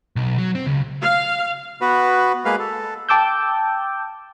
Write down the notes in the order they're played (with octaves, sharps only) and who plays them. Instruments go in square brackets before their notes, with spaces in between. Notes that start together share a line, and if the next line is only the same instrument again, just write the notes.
[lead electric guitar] B1
F#3
C4
C#2
[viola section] F5
[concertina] B3 F#4 B4
G#3 A#3 B4 F5
A4
[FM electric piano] G5 A5 D6 E6 G6